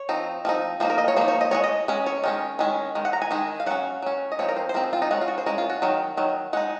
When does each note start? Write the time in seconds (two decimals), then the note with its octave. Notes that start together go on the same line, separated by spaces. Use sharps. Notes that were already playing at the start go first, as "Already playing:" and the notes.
Already playing: C#5
0.09 F3 C4 D#4
0.45 F3 C4 D#4
0.80 F3 A#3 D#4 C5
0.90 A#4
0.98 D#5
1.08 C#5
1.16 F3 A#3 D#4 C5
1.28 C#5
1.41 D#5
1.51 G#3 C#4 C#5
1.64 D#5
1.88 G#3 C#4
2.06 C#5
2.24 D#3 G#3 C#4
2.59 D#3 G#3 C#4
2.95 D#3 G#3
3.05 F#5
3.13 A#5
3.22 G#5
3.31 D#3 G#3 D#4
3.60 F5
3.66 F#3 C#4 F#5
4.02 F#3 C#4
4.32 D#5
4.39 F3 C4 D#4 C#5
4.49 A#4
4.57 C5
4.69 C5
4.74 F3 C4 D#4 A#4
4.83 G#4
4.93 F4
5.02 D#4
5.11 G#3 C#4 F#4
5.21 F4
5.28 F#4
5.38 C5
5.46 G#3 C#4 A#4
5.58 F4
5.70 F#4
5.82 D#3 F#3
6.17 D#3 F#3
6.53 G#3 D#4 F#5